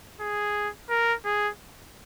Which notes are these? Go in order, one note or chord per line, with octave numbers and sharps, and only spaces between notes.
G#4
A#4
G#4